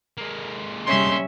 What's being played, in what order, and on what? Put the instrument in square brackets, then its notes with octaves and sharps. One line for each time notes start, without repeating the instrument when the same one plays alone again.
[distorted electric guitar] G#3 A#3
[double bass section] C3 G3 [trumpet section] A3 D#4 C6 [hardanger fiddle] C#4 E5